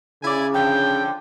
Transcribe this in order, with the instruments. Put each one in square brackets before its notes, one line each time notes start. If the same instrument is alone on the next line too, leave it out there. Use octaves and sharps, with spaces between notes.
[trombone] C#3 [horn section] E4 D5 G#5
[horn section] D3 F3 [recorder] G5